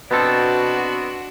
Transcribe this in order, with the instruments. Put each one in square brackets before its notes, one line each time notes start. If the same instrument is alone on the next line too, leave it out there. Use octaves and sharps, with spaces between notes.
[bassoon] B2 [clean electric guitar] B3 C4 A4 [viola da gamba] D4 F#4